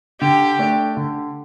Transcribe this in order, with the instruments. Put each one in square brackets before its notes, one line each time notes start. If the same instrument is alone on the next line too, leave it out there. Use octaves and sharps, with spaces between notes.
[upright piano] D3 [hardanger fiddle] G4
[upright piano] A3 D4
D3